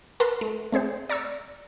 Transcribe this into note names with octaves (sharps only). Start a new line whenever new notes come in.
A#4 B4 F#5 A5 A#5 C6
A3
A3 C4 G#4 C5
D5 A#5 C#6 E6